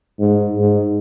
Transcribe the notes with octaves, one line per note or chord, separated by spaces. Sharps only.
G#2
G#2